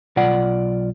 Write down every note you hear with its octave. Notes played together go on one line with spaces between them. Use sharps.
B1 F4 D5 F#5